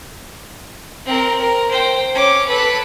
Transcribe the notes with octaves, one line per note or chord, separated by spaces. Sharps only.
C4 A#4
A#4
C5 G5
C#4 D6
A4 B4